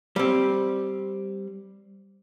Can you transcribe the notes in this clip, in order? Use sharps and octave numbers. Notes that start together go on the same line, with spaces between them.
G3 C4